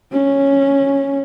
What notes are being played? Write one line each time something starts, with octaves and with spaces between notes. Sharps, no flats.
C#4